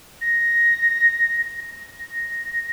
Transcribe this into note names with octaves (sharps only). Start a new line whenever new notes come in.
A#6
A#6